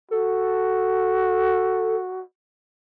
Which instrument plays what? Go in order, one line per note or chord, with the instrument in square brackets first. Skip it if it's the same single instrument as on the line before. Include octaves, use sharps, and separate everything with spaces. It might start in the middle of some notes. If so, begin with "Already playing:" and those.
[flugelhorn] F#4 [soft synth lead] A4